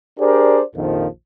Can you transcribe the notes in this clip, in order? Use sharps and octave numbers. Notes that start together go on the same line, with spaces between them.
D4 G4 G#4 A#4 C5 D5
A#1 F2 D#3 F3